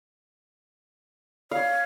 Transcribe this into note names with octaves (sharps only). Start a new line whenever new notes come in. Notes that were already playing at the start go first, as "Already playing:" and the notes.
C#5 F5